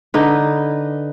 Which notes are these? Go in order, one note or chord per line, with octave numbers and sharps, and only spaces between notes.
D3 D#4 B4